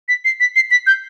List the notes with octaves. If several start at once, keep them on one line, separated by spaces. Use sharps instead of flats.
B6
C7
B6
C7
B6
G6